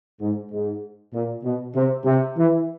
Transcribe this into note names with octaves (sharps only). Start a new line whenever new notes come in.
G#2
G#2
A#2
B2
C3
C3
E3